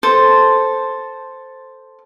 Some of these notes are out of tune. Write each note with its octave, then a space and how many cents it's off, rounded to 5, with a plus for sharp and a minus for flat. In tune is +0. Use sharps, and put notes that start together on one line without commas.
A4 +0 C5 +0